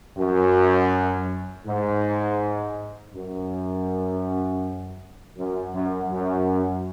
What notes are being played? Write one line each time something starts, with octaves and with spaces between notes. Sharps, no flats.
F#2
G#2
F#2
F#2
F#2
F#2